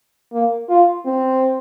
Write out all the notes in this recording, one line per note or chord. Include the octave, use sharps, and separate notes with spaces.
A#3
F4
C4